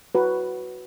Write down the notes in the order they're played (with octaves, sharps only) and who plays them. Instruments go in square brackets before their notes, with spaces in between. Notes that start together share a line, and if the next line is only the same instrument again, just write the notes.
[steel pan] F#4 B4